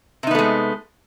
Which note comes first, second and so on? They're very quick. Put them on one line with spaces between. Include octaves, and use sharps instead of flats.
C3 D#4 B3 A3 G#3